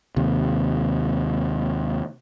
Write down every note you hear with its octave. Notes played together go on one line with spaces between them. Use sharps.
D#2 C3